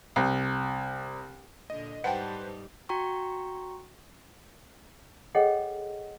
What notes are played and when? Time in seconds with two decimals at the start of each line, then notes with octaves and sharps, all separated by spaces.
0.16 C2
1.70 A#2 D3 D#5
2.04 G#2 G3 D#4 B4 C5 F#5 G5 A5
2.89 F#4 G5 A#5 C#6
5.35 G#4 A4 C#5 D#5 F#5 G5